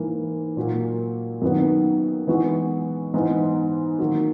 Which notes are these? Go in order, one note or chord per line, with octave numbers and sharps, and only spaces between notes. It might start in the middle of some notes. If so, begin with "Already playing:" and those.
Already playing: G#2 E3 A#3
A#2 F#3 A#3
F#2 D#3 F#3 B3
E3 G#3 B3 D#4 F#4
G#2 E3 B3 D#4
D#3 F#3 A#3